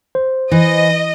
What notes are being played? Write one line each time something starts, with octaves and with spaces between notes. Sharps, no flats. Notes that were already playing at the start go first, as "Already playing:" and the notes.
C5
E3 D#5